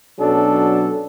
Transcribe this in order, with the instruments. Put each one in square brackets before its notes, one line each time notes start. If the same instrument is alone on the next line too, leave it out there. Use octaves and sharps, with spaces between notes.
[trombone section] B1 B2 F#3 C#4 D4 A4